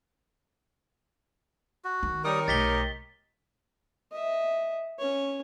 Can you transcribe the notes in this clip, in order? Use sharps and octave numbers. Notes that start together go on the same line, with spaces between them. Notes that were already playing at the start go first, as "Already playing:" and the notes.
F#4
D#3 C4
G3 D#4 A#4 C#5 D#6
B1 A3 G4 D#5 A6 B6 G7
D#5 E5
C#4 C#5